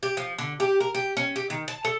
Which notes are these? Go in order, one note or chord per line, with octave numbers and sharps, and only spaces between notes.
G4
F3
D3
G4
A#4
G4
C#4
G4
D#3
A5
A4